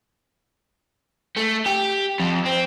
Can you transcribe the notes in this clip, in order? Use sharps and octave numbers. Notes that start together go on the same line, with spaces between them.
A3
G4
F2
C4